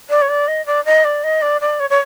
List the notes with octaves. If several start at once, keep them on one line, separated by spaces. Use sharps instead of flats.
D5
C#5
D5
D#5
D5
D#5
D5
D#5
D5
D5
C#5
C#5